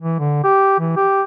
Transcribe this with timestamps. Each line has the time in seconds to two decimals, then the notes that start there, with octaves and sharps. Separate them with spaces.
0.02 E3
0.19 D3
0.44 G4
0.79 E3
0.97 G4